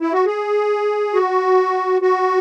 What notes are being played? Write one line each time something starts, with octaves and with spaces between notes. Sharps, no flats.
E4
F#4
G#4
F#4
F#4